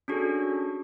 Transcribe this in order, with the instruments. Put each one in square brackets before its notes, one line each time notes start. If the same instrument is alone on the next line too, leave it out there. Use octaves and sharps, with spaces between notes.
[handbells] C#4 D4 F#4 G#4 A4